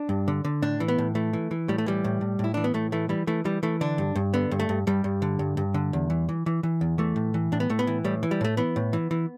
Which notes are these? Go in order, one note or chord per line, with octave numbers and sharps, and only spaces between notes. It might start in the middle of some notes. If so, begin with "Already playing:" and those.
Already playing: D4
G2
D3
D3
A2 D4
E3
B3
A2
E3 A3
E3
E3
A2 G3
A3
E3 G3
A2
A2
A2 E4
E3 D4
B3
A2 A3
E3 A3
E3 G3
E3 A3
E3 G3
E3 A3
D3 D4
G2
G2
D3 B3
G2
A3
G2
G2 G3
G2
D3
G2
G2
D3
E2
E3
E3
E3
E3
E2
E3 A3
A2
E3
A2 D4
B3
A2 A3
B3
E3
A2 G3
E3
G3
A2 A3
E3 B3
A2
E3
E3